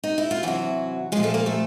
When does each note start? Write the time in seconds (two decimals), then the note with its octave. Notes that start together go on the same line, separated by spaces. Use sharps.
0.04 D#4
0.18 E4
0.31 F4
0.43 C3 E3 F#3 F#4
1.12 A#2 F3 G#3 G#4
1.23 A3 A4
1.34 A#3 A#4
1.46 A3 A4